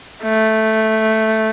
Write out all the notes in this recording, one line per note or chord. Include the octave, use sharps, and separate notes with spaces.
A3